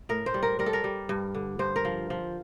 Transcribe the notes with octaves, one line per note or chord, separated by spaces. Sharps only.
A2 A#4
C5
G3
A#4
G3 A#4
A4
A#4
G3
G2
D3
G2 C5
A#4
F3
F3